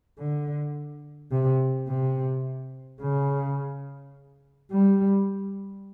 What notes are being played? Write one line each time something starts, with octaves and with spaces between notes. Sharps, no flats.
D3
C3
C3
C#3
G3